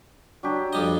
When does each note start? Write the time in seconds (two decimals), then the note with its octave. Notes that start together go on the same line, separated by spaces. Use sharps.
0.43 F#3 D4 G4
0.73 F2 G3 D#5